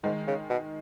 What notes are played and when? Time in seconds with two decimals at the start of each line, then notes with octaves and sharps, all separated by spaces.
0.04 G#2 D#3 G#3
0.27 C#3
0.50 B2